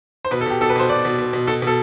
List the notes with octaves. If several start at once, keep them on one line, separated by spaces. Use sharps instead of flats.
C5
B2 B4
A4
B2 G4
B2 A4
B4
B2 C5
B2 D5
B2
B2
B2
B2 A4
B2 A4